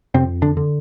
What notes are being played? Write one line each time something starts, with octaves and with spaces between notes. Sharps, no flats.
F2 C3 C4
D3 D4
D3